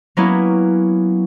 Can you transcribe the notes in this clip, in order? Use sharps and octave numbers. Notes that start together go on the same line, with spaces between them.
F#3 A#3 B3 C#4 E4